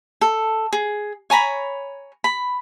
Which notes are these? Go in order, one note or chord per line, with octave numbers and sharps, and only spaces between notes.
A4
G#4
C#5 G#5 A#5 B5
B5